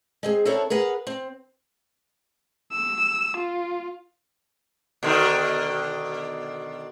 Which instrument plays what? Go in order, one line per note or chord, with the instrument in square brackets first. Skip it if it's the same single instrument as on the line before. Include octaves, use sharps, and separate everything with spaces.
[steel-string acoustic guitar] G#3 C4 G#4
C4 D4 E4 A4 A#4 C#5
G#4 A#4 B4 F#5
C4
[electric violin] E6
F4
[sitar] B2 D3 D#3